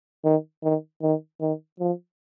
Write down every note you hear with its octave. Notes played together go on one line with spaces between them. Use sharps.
D#3
D#3
D#3
D#3
F3